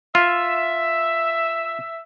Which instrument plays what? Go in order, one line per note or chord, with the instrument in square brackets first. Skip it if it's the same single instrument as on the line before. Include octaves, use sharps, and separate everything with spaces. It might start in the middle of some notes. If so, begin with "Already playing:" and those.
[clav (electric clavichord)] F4 [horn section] E5